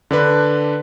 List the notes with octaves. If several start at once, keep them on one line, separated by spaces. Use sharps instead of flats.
D3 D4 B4